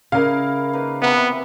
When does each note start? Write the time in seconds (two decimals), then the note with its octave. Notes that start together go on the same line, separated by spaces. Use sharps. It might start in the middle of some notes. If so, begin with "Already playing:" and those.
0.12 C#3 E4 A#4 D5 F5
0.73 A#3 D#4 B4
1.02 C3 E3 B3 F#5